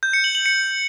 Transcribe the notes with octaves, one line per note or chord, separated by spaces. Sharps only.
G6
C#7
F#7
F#7
C#7